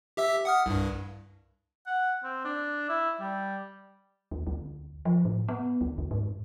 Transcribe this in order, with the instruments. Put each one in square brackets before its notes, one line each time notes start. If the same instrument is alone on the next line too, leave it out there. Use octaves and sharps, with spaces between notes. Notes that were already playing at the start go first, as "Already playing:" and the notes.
[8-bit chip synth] G4 E5 E6
F#5 D#6 F6
C2 G2
[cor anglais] F#5
C4
D4
E4
G3
[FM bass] D#2
D2
F3
A2
B3
D2
D#2
G#2